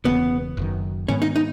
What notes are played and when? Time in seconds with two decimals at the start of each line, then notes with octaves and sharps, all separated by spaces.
0.04 E1 E2 C#3 B3
0.57 F#1 F#2 D#3
1.08 G#2 D#3 G#3 B3 C#4
1.22 D#4
1.36 D#4